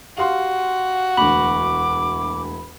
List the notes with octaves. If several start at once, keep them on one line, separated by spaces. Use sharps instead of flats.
F#4 G4 F5 C6
E1 D2 B5 D6